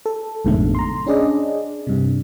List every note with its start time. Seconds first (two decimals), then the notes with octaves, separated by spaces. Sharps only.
0.06 A4
0.45 A1 F2 G#2 B2 D3 A3
0.75 A#5 C6
1.06 C#4 D4 G#4 D5 D#5
1.87 G2 C3